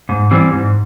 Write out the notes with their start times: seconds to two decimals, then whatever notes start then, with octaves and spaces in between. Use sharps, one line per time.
0.09 G#2
0.31 E3 G3 C4
0.53 G#2